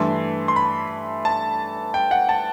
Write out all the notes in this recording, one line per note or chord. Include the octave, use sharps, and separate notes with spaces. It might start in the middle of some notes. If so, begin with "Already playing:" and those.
Already playing: G2 E3 A3 C6
C6
B5
A5
G5
F#5
A5